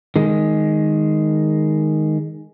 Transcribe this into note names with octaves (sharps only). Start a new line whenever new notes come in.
D#3 G#3